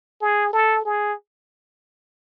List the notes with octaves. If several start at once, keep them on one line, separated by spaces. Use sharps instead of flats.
G#4
A4
G#4